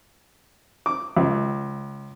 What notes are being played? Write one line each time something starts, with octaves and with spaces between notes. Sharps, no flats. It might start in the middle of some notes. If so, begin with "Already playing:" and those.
D6
C#2